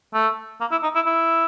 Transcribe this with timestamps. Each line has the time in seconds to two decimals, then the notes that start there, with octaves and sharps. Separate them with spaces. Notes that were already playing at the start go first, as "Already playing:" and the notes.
0.14 A3
0.61 A#3
0.71 E4
0.83 D#4
0.95 E4
1.06 E4